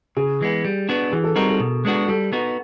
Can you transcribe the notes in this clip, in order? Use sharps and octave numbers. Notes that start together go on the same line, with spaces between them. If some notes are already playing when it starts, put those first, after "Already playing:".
C#3 G#4
E3 G#3 B3
G3
B3 D4 F#4
E3 G#4
A4
G3 C4 D#4 F#4 A#4
A4
B2
G#3 B3 D4 F#4
G3 A4
B3 D#4 F#4